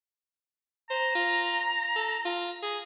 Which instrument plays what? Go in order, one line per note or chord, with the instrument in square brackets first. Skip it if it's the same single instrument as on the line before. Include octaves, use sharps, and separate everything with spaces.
[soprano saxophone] C5 [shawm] A#5
[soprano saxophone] F4
A4
F4
G#4